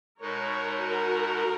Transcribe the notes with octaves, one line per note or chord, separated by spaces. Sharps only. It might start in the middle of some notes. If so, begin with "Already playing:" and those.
B2 G#3 D#4 A#4 C#5
F#4 A#4